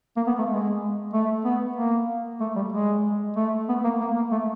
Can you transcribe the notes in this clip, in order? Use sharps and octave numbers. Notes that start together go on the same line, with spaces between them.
A#3
B3
A3
G#3
A3
B3
A#3
A3
G3
G#3
A3
B3
A#3
A#3
A#3
A3